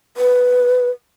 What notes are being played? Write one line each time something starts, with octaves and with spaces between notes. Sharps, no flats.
B4